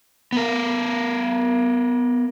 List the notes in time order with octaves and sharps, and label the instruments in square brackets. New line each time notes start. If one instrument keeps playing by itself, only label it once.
[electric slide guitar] B3 A#4